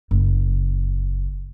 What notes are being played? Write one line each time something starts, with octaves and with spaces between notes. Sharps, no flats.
F#1